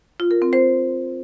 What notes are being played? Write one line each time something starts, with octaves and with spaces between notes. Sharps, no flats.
F4
A#4
C4
C5